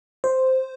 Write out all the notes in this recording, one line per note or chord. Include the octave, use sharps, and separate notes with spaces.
C5